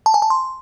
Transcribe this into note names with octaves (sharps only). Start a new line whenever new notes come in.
A5
G#5
A5
C6